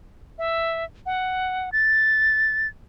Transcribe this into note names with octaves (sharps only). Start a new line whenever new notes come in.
E5
F#5
A6